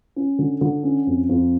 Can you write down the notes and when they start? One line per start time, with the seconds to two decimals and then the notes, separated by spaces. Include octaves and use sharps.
0.16 C#4
0.39 D3
0.61 D3
0.83 C#4
1.07 F2
1.29 F2